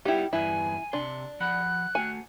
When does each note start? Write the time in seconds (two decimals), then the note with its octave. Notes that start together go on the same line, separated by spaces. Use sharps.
0.05 G3 B3 D#4 E4 G4
0.33 E2 G2 E4 B4 G#5
0.93 C3 D4 C6
1.40 F3 F#5 B5 F#6
1.95 A3 F#4 G#5